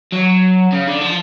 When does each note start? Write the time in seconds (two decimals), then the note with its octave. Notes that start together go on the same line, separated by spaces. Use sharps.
0.13 F#3
0.72 C#3
0.87 D3
1.01 F3